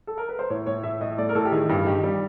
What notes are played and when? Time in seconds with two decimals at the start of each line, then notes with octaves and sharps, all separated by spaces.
0.07 A4
0.18 A#4
0.29 B4
0.39 C5
0.50 A2 C#5
0.66 A2 C#5
0.83 A2 E5
1.01 A2 D#5
1.18 A3 D5
1.29 A#4
1.35 A2 A4
1.45 G4
1.52 D#3 G#4
1.69 G2 G4
1.86 D#3 G4
2.03 G3